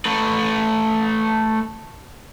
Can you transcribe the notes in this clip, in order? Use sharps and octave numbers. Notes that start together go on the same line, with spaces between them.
A3 B4